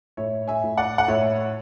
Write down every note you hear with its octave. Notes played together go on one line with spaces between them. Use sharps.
A2 C#5 E5
E5 G#5
A2
D5 F#5
F#5
A2 C#5 E5